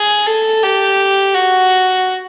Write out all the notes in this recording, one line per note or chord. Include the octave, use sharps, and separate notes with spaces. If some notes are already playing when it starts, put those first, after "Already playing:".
Already playing: G#4
A4
G4
F#4